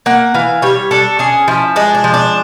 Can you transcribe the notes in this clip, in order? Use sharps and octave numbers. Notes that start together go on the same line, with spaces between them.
A#3 F#5
E3 F5
G3 C#5
D4 A4
C#4 G#4
F3 E4
G#3 D4
D4
F3
D4